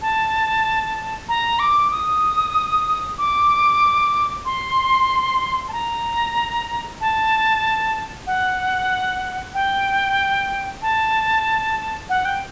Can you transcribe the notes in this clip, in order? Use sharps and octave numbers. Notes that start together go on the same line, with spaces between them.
A5
A#5
D6
D#6
D6
C6
A5
A#5
A5
F#5
G5
A5
F#5
G5